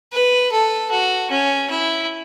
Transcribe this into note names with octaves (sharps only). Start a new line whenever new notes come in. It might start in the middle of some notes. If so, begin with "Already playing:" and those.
B4
A4
F#4
C#4
E4